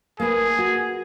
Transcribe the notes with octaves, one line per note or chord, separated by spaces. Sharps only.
A#3 G#4 B4
F#4